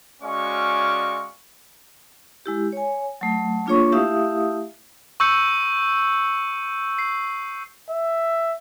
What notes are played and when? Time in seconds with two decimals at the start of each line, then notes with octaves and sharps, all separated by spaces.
0.22 G#3 C#4 F#4 D5 F5 C#6
2.46 G#3 E4 G4
2.73 C#5 G#5
3.21 F#3 A3
3.66 A#3 D4 F4 G#4 C#5 C#6
3.92 A3 E4 G4 E5 F5 D#6
5.20 C#6 E6 G6 C#7
6.99 C7
7.90 E5